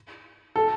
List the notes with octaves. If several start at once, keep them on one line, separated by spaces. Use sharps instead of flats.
A4